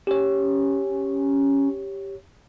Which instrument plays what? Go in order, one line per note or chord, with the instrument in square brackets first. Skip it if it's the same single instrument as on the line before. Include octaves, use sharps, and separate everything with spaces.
[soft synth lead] C#4 [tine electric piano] G4 C#5